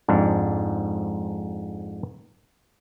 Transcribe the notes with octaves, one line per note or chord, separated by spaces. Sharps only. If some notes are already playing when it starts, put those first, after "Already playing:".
F2 G#2 D4